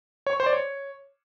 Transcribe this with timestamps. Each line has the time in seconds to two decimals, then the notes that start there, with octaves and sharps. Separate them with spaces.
0.27 C#5
0.33 C#6
0.40 C5
0.46 D5
0.53 C#5